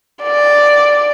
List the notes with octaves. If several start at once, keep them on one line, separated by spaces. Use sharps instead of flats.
D5